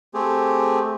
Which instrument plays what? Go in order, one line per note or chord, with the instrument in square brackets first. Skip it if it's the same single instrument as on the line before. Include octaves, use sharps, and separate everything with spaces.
[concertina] A3 C4 G4 G#4